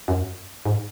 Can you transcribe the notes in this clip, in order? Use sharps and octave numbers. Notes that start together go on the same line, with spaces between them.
F#2
G#2